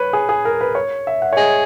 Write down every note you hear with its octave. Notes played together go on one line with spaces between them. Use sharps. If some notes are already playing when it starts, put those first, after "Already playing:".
Already playing: B4 C#5
G#4
G#4
A#4
B4
C#5
E5
F#5
C#5
G#4 D#5